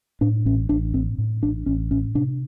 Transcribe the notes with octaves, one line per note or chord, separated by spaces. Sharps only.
A2 D4
A1 C#4
A1 D4
A2 C4
A2
A1 D4
A1 C#4
A2 C#4
C3 D4